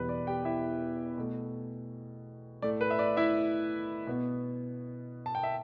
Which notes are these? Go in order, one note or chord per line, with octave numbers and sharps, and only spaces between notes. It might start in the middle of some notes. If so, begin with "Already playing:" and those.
Already playing: E2 B2 G3 B3 B4
D5
G4 G5
E4 E5
B2 A3
A2 A3 D5
B4
E5
D5
E4 E5
B2 B3
A5
G5
E5